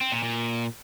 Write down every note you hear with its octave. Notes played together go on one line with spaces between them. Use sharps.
C4
A#2
A#2